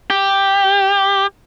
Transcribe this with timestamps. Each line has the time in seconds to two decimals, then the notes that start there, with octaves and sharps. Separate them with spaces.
0.10 G4